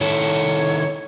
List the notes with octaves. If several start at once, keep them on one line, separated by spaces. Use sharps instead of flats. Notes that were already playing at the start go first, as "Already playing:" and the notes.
D#3 E4 A4 C#5